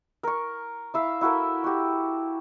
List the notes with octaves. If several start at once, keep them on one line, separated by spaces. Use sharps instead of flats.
A#4 C#6
E4 E5 F5
E4 F#4 A4 A#4
F#4 G4